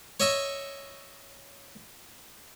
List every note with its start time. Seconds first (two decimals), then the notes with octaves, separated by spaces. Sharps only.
0.20 C#5 D#5 E5 C#6